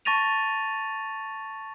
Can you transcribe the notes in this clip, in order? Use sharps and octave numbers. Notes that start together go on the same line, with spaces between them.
A5 C#6 A6 A#6 D#7 F7